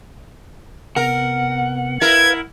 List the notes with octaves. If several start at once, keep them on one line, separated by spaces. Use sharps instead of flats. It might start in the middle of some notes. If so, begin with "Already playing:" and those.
C3 B3 A#4 F#5
E4 A#4 B4 F5 G#6